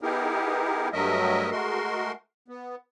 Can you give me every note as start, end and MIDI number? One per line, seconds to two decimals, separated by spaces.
0.02 0.88 59
0.02 0.88 63
0.02 0.88 64
0.02 0.88 67
0.02 0.88 68
0.02 0.88 70
0.93 1.50 43
0.93 1.50 54
0.93 1.50 57
0.93 1.50 70
0.93 1.50 75
0.93 1.50 76
1.51 2.12 56
1.51 2.12 57
1.51 2.12 66
1.51 2.12 70
1.51 2.12 84
2.48 2.75 59